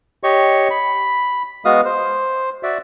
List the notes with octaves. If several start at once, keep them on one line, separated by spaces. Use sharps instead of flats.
G4 C#5 D#5 C#6
B5
G#3 B3 F#4 F5 D#6
C5
F#4 D5 E5